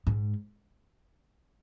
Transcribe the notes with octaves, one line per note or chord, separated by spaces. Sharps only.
G#2